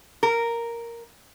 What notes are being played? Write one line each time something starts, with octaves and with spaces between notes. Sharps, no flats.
A#4